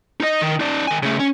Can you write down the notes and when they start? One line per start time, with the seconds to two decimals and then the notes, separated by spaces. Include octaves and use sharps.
0.20 D#4 D#5
0.42 D#3
0.60 D#4 D5
0.87 D#3 G#5
1.03 C#3 A3
1.19 C#4